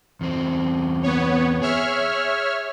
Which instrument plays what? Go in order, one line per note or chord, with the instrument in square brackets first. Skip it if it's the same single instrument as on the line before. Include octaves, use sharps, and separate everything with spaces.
[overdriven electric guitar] E2 C4
[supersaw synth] B3 C#5
[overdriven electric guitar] G#4 [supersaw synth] C#5 E5 F6